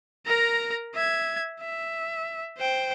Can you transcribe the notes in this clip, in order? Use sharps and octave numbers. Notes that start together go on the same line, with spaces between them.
A#4 A#5
E5 G#6
E5
C5 G5